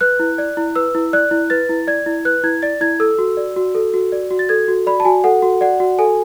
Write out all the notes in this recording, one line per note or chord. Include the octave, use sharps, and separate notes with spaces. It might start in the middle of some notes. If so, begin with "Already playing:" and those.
B4 F#6
E4
D5
E4
B4 E6
E4
D5 F#6
E4
B4 A6
E4
D5 G#6
E4
B4 F#6
E4 G#6
D5 A6
E4 G#6
A4 E6
F#4
D5
F#4
A4
F#4
D5
F#4
A6
A4 G#6
F#4
D5 B5
A5
F#4 G#5
A4 F#5
F#4
D5 F#5
F#4
A4 G#5